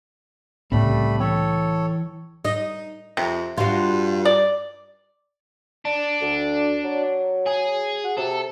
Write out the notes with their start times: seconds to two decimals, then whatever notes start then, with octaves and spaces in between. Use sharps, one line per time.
0.72 C2 A2 C#3 G3 A3 C4 B5
1.20 E3 A4 C#5 G5
2.45 D#4 D#5
3.17 F2 C3
3.58 G2 F4 F#4
4.25 D5
5.85 D4
6.21 D2
6.84 F#3
7.47 G#4
8.04 F#4
8.18 C3 A4